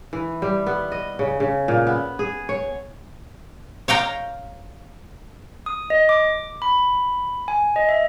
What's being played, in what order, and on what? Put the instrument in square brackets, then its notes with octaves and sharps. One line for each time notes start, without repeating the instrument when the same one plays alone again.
[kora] E3
G3
B3
D#5
C#3
C#3
A#2
B3
G#4
C#5
[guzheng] C#5 F5 G5 A#5
[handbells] D#6
D#5
D6
B5
G#5
D#5
E5